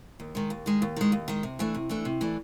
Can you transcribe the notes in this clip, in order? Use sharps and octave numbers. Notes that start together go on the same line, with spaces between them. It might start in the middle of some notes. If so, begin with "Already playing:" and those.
D#2
D#3 G#3
D#2
D#3 G#3
D#2
D#3 G#3
D#2
D#3 G#3
C3
E3 A3 D4
C3
E3 A3 D4
C3
E3 A3 D4